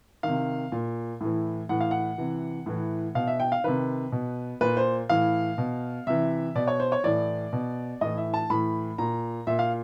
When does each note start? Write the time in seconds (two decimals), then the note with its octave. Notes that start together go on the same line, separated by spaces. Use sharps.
0.23 C3 D#3 F5
0.72 A#2
1.21 A2 E3
1.69 A2 E3 F#5
1.81 F5
1.91 F#5
2.18 C3 E3
2.66 A2 E3
3.15 B2 F5
3.27 E5
3.40 G5
3.52 F5
3.64 C3 D#3 B4
4.12 B2
4.61 A#2 B4
4.77 C5
5.09 A2 E3 F5
5.58 B2
6.07 C3 E3 E5
6.55 B2 D5
6.67 C#5
6.80 C5
6.92 C#5
7.04 A2 E3 D5
7.53 B2
8.01 A2 E3 D#5
8.17 E5
8.34 A5
8.50 A2 E3 B5
8.98 A#2 A#5
9.47 A#2 E5
9.59 F5